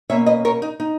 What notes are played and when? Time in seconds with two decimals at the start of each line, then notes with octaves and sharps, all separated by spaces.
0.10 B2 A#3 C#4 C#5 E5
0.26 B4 D#5
0.45 A#4 C#5
0.62 D#4
0.80 D#4